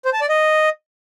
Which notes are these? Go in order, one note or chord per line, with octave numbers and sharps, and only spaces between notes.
C5
A5
D5
D#5